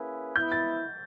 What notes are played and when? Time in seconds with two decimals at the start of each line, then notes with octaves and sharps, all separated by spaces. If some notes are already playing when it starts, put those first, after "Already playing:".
Already playing: A#3 C#4 E4 G#4 B4
0.36 B3 E4 G6
0.52 A6